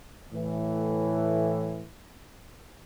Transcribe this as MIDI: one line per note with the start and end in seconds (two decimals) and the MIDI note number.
0.32 1.88 45
0.32 1.88 52